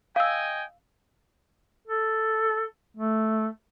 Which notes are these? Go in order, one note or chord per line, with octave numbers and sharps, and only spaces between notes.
D#5 F5 G5 G#5 E6
A4
A3